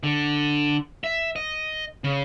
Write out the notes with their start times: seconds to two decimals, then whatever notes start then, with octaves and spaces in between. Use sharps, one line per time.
0.03 D3
1.04 E5
1.36 D#5
2.04 C#3